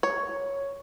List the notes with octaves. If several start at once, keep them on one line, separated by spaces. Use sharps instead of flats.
C#5